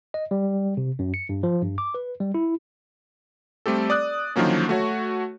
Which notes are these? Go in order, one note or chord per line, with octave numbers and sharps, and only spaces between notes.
D#5
G3
C3
F#2
C#7
G2
F3
G2
D6
B4
G3
E4
G3 A3 C4 G4 A4
D5 D#6 F#6
D3 D#3 F3 F#3 A#3 C#4
A3 F#4 C#5